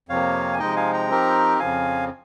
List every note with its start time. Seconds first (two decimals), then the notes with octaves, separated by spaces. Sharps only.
0.09 F2 C3 F3 A#3 C#5 F5
0.53 G#5
0.59 C3 F3 G#3 D#4 D#5 G5
0.76 F5 G#5
0.93 G5 A#5
1.09 F3 C4 D#4 G4 A#4
1.59 F2 C#3 F3 F5 G#5